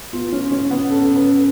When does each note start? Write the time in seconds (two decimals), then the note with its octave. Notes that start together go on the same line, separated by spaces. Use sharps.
0.13 B3 F4
0.32 C#4
0.52 C#4
0.71 B3
0.90 C#4 A4
1.15 B4